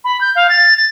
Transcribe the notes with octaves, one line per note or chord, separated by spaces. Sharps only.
B5
G6
F5
A6
A6